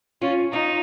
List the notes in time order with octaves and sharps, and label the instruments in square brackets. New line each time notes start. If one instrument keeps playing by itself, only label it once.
[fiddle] C#4 [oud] F4
[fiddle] D#4 [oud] F4